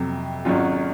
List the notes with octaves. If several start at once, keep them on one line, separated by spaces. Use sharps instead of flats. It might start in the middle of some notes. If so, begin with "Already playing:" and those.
Already playing: F2 C3 F#3
G#1 G#2 F#3 C#4 F4